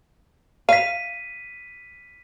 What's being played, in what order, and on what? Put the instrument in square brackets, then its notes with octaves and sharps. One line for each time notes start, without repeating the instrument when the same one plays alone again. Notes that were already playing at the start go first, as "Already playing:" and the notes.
[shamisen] F5 [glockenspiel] B6 D#7